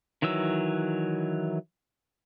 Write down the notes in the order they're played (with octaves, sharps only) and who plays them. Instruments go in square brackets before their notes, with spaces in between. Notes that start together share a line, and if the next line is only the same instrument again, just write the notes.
[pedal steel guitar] D#3 E3 F#3 E6